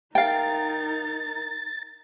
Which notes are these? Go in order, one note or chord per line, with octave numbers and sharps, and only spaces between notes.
D#4 A#4 F5 G5 A6